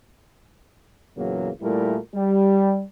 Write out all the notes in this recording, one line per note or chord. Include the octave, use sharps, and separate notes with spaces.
E2 A#2 C#3 F#3 A#3
A#2 G3 A3 E4 A#4
G3